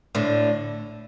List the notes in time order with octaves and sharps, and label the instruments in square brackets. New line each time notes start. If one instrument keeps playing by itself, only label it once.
[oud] A2 D3